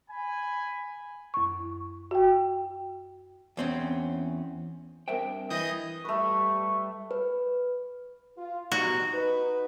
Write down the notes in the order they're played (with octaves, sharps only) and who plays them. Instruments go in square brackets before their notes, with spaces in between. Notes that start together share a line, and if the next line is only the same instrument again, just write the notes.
[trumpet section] G#5 B5
[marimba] F#2 C#6
F#4 G5
[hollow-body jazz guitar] E2 C4 C#4
[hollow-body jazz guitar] G2 E5 G5 [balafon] C4 A#4 C5
[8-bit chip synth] E3 D#6 G6 [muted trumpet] D#5
[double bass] G3 [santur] A3 B4 [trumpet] C#6
[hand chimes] B4
[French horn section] F4
[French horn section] B2 G3 D#4 [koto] F#4
[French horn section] D#4 B4